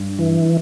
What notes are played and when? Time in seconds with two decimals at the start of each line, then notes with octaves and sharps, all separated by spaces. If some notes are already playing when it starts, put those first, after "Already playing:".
Already playing: G2
0.19 E3